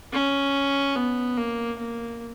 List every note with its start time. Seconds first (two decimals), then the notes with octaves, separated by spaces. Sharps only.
0.13 C#4
0.96 B3
1.37 A#3
1.79 A#3